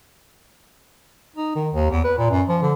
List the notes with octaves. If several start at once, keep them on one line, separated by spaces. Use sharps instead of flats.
D#4
D#3
D#2
E2
B4
A#2
F#2
F3
D3